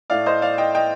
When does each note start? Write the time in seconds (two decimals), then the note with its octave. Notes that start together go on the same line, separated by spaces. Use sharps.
0.10 A2 A3 D5 F5
0.26 C5 D#5
0.42 D5 F5
0.58 D#5 G5
0.75 D#5 G5